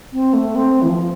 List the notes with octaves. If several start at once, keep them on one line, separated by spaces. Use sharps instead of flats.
C4
A3
C4
E3
F3